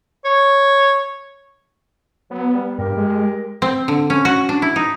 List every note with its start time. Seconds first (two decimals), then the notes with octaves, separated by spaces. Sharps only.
0.24 C#5
2.31 F#3 B3
2.53 G3
2.79 G2 G4 A#4
2.97 G#3
3.62 C4
3.88 D3
4.10 C#4
4.25 F#4
4.49 D4
4.62 E4
4.76 D#4